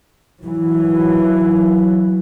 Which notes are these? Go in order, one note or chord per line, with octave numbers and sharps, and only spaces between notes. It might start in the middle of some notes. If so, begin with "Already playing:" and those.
E3 F#3